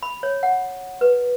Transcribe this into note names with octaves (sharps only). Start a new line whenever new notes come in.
B5
C#5
F#5
B4